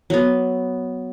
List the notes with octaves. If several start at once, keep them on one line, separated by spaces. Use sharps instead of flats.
F#3 B3